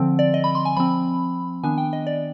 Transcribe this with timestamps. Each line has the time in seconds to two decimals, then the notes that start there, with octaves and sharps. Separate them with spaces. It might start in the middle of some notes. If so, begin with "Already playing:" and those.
Already playing: D3 F3 C4
0.19 D5
0.34 D#5
0.44 B5
0.55 C6
0.65 G#5
0.77 F3 C4 B5
1.64 D#3 B3 D4 G#5
1.78 G5
1.93 D#5
2.07 D5